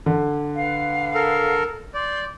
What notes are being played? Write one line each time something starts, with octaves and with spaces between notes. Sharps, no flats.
D3
B4 F5 F#5
A4 A#4
D5 C6 G6